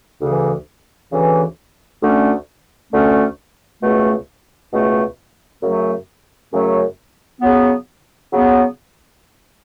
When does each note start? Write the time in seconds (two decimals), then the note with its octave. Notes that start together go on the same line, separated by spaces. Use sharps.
0.20 D2 C#3 E3
1.11 D2 C#3 E3
2.01 D2 D3 A3 C#4
2.92 D2 D3 A3 C#4
3.81 C#2 B2 A3
4.71 C#2 B2 A3
5.62 F#2 C#3 F#3 A3
6.52 F#2 C#3 F#3 A3
7.41 C#3 F#3 B3
8.32 C#3 F#3 B3